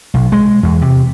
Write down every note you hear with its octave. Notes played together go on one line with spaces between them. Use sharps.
B1
G#3
E2
C3